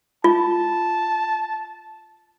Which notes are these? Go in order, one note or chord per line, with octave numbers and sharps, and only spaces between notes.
F4 A5